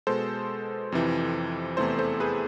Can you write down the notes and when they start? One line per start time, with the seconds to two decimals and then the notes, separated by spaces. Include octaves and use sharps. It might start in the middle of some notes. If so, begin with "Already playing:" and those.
0.07 B2 G#3 A4 C5
0.92 F2 C3 E3
1.77 E2 C3 E3 A3 A4 C5
1.99 A4 C5
2.20 G#4 B4